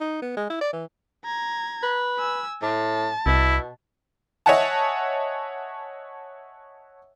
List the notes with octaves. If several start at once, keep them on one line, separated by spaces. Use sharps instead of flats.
D#4
B3
G#3
E4
D5
E3
A#5 G#6
B4
G#5 E6
A2 A5
C2 B2 E4
C#5 D#5 E5 F#5 G#5 A5